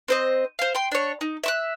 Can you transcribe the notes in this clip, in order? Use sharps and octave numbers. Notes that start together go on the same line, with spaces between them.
C4 C5 D#5
C5 F5
G5 C6
D4 C#5
D#4
E5 C#6 F#6